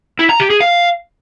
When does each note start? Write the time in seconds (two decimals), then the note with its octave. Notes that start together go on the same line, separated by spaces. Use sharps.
0.19 E4
0.29 A#5
0.40 G4
0.50 G#4
0.61 F5